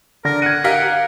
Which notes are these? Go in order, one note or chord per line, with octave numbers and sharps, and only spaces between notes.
D3 D4 A#4 A#6
F#5 G#6 D#7
G4 A#4 F5 B6